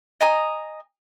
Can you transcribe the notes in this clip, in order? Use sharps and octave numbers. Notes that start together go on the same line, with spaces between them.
D#5 G#5 A#5 D#6